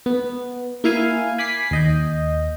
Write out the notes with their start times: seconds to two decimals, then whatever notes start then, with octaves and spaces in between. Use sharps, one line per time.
0.06 B3
0.84 A#3 E4 F5 G#5
1.38 G#5 B5 D6 B6 C7
1.71 D#2 D#5 G6